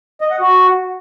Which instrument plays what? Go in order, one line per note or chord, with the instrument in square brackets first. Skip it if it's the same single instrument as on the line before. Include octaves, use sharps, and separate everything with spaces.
[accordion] D#5
F#5
F#4